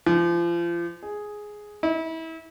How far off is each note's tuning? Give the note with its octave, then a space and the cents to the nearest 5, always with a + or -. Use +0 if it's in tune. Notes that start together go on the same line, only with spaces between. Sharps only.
F3 -35
G#4 +5
E4 -30